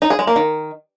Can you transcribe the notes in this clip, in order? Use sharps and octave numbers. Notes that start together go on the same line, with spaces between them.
D#4
G#4
G#3
A#3
D#3